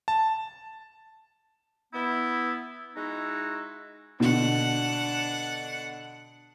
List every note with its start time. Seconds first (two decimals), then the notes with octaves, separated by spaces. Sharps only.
0.08 A5
1.94 B3 E4
2.96 G#3 D#4 E4 F#4
4.20 B2 D3 D4 F#5